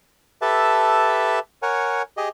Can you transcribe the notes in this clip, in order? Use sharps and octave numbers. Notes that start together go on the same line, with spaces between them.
G4 A4 B4 E5 A5
A#4 C#5 F#5 G#5
G4 G#4 D#5